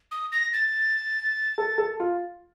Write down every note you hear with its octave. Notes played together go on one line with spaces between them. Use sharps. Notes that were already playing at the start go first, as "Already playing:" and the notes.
D#6
A#6
A6
A4
A4
F4